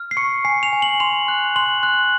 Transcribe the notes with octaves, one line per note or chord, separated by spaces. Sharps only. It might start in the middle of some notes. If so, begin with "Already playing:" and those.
Already playing: F6
C7
C#6 C#7
G#5 C7
F7
G#5
F#7
C6 F7
F#6
C6 F#7
F#6